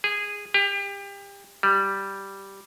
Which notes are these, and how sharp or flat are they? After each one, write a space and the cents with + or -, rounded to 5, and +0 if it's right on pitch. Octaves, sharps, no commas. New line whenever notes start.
G#4 -15
G4 +30
G3 -5